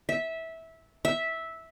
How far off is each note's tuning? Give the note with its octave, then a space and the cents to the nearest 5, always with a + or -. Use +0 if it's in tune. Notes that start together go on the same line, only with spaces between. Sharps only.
E5 -15
E5 -10